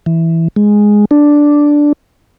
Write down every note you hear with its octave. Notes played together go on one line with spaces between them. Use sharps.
E3
G#3
D4